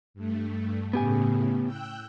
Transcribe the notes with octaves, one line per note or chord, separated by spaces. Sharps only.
G2 A3
A2 C#3 B3 G4 G#5
G5 E6 F#6